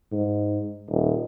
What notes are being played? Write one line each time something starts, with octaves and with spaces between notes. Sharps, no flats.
G#2
D#1